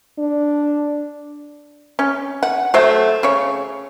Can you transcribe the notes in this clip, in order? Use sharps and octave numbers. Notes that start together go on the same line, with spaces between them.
D4
C#4
F#5
F#3 A3 C5 E5
C#3 C#5